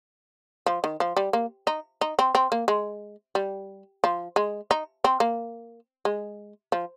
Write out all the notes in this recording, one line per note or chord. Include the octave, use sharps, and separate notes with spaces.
F3
D#3
F3
G3
A#3
D#4
D#4
C4
C4
A#3
G#3
G3
F3
G#3
D#4
C4
A#3
G#3
F3